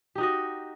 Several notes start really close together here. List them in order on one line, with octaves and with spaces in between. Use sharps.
G4 D#4 F#4 D#5